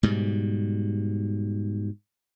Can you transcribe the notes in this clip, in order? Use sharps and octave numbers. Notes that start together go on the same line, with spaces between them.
G#2 B2 G3